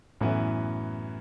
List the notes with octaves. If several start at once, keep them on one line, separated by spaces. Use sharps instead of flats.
F#2 A2 E3 B3 E4